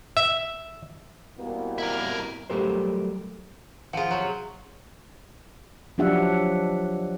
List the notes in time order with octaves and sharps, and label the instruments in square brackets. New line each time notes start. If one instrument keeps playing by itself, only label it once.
[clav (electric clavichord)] E5
[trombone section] C2 B2 A#3
[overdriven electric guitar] E4 A#4
[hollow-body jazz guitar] F#3 G3 A3 G4 A#4 C5
[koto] F3 F4 [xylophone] G#4 F#5
[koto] C3 F#3
[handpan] F3 F#3 D4 G4 E5 F#5